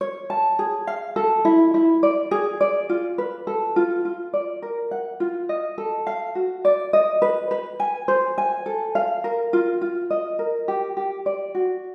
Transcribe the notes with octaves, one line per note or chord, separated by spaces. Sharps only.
C#5
A5
G#4
F5
A4
E4
E4
D5
G#4
D5
F4
B4
A4
F4
F4
D5
A#4
F#5
F4
D#5
A4
F5
F#4
D5
D#5
B4
B4
G#5
C5
G#5
A4
F5
A#4
F4
F4
D#5
A#4
G4
G4
D5
F#4